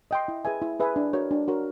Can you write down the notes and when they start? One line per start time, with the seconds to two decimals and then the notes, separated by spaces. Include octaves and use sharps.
0.11 D#5 G5 C6
0.28 E4
0.45 G#4 B4 E5 G#5
0.62 E4
0.80 G#4 B4 E5 G#5
0.96 D4
1.13 F#4 A#4 C#5
1.31 D4
1.48 F#4 A#4 C#5